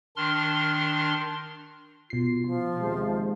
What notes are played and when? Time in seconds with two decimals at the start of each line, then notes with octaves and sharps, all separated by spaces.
0.16 D#3 D4 C6 F6
2.10 B2 F4 C7
2.47 F3
2.79 D#2 C3 G#3